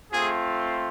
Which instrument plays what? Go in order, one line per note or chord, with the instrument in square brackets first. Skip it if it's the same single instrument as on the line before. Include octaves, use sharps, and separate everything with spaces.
[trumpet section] A3 C4 F4 G#4